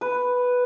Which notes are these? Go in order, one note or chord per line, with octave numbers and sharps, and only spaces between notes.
B4